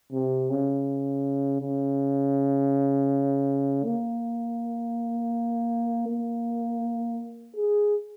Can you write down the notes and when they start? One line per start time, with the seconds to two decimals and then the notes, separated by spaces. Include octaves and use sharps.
0.12 C3
0.50 C#3
1.61 C#3
3.85 A#3
6.08 A#3
7.57 G#4